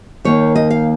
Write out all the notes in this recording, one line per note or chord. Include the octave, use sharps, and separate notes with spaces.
D#2 D#3 A#3 C#5
D#5
F5